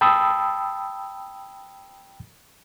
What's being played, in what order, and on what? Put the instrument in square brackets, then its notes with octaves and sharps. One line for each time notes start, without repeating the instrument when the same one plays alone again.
[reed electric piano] G5 A5 B5 D#6 E6